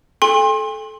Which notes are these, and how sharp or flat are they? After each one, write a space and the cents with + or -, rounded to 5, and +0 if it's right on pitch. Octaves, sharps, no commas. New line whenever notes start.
A4 -25 G5 +45 C6 +30